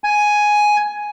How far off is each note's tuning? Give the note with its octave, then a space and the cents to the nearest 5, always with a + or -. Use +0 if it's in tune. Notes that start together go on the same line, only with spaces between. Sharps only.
G#5 +5